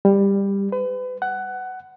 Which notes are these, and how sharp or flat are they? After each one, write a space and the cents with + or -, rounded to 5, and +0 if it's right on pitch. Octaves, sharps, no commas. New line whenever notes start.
G3 +15
B4 +35
F#5 +15